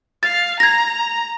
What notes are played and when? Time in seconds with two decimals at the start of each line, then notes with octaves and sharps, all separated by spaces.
0.23 F5 A6
0.60 A#5 G#6 A#6